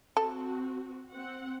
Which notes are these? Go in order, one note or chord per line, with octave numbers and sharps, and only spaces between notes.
C4 F#4 A4
C4 F#5